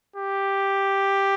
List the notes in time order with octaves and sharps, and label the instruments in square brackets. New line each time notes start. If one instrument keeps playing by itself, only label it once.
[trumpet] G4